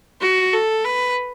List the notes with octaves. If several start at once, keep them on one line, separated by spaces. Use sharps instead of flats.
F#4
A4
B4